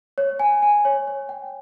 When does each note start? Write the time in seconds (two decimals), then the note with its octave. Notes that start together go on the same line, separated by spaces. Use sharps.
0.18 C#5
0.40 G#5
0.62 G#5
0.85 C#5
1.07 C#5
1.29 G5